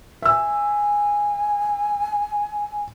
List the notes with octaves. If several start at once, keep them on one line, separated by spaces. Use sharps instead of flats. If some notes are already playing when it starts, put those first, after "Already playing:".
E5 G#5 E6